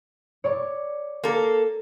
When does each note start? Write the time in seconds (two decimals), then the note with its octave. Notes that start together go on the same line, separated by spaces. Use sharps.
0.44 C#5 D5 C#6
1.24 A#3 A4